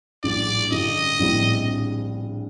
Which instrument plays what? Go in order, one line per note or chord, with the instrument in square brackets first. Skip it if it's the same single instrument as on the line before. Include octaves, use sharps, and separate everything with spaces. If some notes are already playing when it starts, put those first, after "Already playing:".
[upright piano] A#1 A2 G3 [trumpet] D5
[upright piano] G2 D3 G3 [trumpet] D#5
[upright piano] A#1 A2 G3 C4